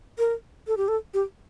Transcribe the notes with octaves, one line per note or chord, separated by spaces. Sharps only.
A#4
A4
G4
A4
G4